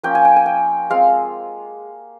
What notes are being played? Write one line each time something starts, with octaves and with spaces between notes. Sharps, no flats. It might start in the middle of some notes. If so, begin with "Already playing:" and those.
F3 A#3 C#4 G5
G#5
G5
G#5
G5
G#3 C4 F4 F5